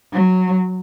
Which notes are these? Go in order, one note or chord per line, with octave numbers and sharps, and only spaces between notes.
F#3